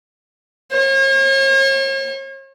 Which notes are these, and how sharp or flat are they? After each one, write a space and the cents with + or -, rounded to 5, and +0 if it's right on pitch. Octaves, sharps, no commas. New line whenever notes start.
C#5 -45